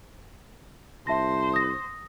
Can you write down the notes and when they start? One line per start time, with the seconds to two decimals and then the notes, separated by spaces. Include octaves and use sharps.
1.07 C2 C5 E5 A5 A#6
1.53 D#6 A#6